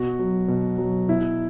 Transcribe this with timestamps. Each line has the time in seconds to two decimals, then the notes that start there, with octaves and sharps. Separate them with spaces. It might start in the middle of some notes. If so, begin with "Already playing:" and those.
Already playing: B2 F#4
0.19 F#3
0.48 B2
0.78 F#3
1.08 B2 E4